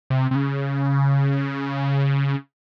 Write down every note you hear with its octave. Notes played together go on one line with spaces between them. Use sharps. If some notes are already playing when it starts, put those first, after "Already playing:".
C3
C3
C#3